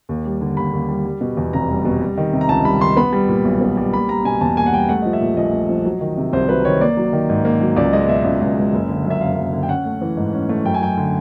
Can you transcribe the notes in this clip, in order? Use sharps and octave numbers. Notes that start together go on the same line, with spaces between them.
D#2
G3
D3
D#2 B5
D#2
G3
G3
B2
E2
F1 A#5
G3
B2
G3
D#3
C3
A#5
C#2 A5
G3 B5
D#3 C6
B3 B5
G3
A#2
B1
B3
G3
A#3 B5
G3 A#5
B2 G#5
E2 A5
A#3 G#5
F#5
G3 G5
A3 F#5
F3 D#5
E5
A#2
A#1 D#5
A3
F3
F#3
D#3
C3
C2 C5
F#3 B4
D#3 C#5
A#3 D5
F#3
D#3
G#2
A#3
F#3
C#2 D5
G#3 D#5
B2 E5
C#2
C#2
G#3
F#1
D3
F#2
E5
F#1 F5
F#1
D3
G5
C#4 F#5
A3
E3
G#2
C#4
A3
F#2 G5
G#5
F#3 G5
D3